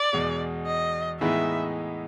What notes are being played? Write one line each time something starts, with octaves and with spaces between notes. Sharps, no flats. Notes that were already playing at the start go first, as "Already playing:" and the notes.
Already playing: D5
E2 B2 G#3
D#5
A2 E3 G#3 B3 D#4 E5